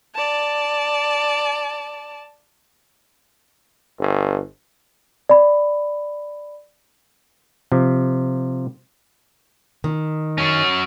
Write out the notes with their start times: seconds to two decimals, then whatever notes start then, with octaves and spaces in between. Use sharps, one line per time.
0.15 D5 A5
3.99 G1
5.29 D5 B5
7.72 C3 F3
9.84 D#3
10.38 F#3 C#4